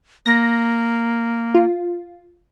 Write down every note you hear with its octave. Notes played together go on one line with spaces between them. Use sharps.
A#3 A#6
F4